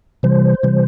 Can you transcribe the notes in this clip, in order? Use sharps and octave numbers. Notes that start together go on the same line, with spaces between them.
C3 E3 G3 C5
C3 E3 G3